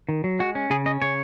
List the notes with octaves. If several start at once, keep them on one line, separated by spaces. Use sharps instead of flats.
D#3
F#3
G#3 F#4
C#4
C#3 G#4
C#4 D#5
C#3 C#5